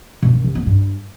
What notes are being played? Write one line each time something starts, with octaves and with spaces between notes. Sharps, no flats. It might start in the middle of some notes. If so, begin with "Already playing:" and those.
B2
D#3
C3
B3
G2